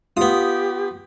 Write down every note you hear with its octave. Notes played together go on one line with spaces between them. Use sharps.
B3 F4 G4 D#6